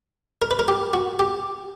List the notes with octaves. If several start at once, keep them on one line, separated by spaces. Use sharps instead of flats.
A#4
B4
A#4
G4
F#4
G4